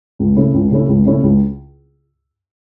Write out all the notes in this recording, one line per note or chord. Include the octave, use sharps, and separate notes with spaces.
C#2
C#3 A3 C#4 E4
C#2
C#3 A3 C#4 E4
C#2
C#3 A3 C#4 E4
C#2